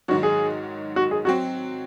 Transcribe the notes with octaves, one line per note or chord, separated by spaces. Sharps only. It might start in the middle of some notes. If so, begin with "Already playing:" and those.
G#2 D#3 F#3 F#4
G#4
F#4
G#4
F#3 C4 F#4